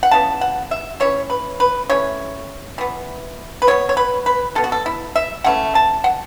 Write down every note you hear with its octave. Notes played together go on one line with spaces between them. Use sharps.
F#5
C#3 E3 B3 A5
F#5
E5
E3 C#4 C#5
B4
B4
E3 A3 C#4 C#5
E3 B3
B4
B2 B3 C#5
C#5
B4
B4
B2 B3 A4
F#4
A4
E4
E5
E3 A3 C#4 F#5
A5
F#5